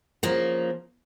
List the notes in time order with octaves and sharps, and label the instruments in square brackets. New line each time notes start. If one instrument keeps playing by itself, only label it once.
[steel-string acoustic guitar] C#3 F3 A#3